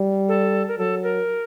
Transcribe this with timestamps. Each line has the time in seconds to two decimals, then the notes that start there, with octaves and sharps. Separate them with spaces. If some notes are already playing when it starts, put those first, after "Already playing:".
Already playing: G3
0.28 A4
0.68 A#4
0.78 F#3 A4
1.03 A#4